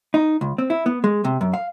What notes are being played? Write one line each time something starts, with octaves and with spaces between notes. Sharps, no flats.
D#4
C#2
C4
E4
B3
G#3
C3
F#2
F5